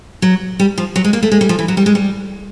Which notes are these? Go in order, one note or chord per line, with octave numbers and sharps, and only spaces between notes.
F#3
G3
F3
F#3
G#3
A#3
A3
G#3
G3
F3
E3
F#3
G3
G#3
G3